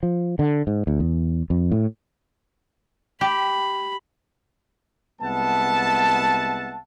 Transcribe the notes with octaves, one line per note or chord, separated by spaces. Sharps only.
F3
D3
G#2
D2
E2
F2
A2
G4 B5
C2 G#3 B3 E5 F#5 A5